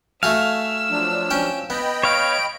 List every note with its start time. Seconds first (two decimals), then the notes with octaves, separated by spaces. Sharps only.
0.23 A3 F#4 F5 G#5 E6
0.90 F3 F#3 D4
1.30 C#4 G5
1.70 B3 D#5 G5 B5
2.03 C#5 F5 D7